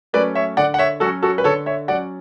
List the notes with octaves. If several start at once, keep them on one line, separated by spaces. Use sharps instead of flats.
F#3 A3 C#4 B4 D5
C#5 E5
D3 D5 F#5
F#5
C#5 E5
F#3 C#4 F#4 A4
F#4 A4
B4
D3 A4 C#5
C#5 E5
F#3 C#4 D5 F#5